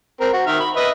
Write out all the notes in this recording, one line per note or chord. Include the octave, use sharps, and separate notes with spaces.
C4 A#4
F#4
D#3 E5 F6
B5
B4 D#5 E5